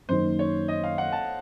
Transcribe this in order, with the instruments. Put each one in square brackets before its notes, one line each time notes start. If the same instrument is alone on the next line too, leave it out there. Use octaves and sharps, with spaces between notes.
[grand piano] F#2 D#3 A#3 D#4 [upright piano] C5
[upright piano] C#5
D#5
F5
F#5
A5